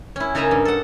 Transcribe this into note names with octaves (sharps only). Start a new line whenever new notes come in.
C#4 E4
C#3 D#4 A#4 E5 G#5 A#5
G2
A4 F#5